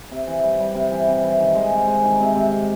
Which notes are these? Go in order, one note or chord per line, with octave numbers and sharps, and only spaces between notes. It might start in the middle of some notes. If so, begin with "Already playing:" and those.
C3
E3
G3
G3
C3
E3
C3
E3
D#3
G#3
C3
G#3
D#3
C3
C3
C3